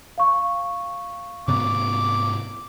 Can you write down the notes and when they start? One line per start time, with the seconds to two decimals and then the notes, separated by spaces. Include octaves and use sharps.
0.18 F5 C#6
1.48 G#2 C3 B3 D6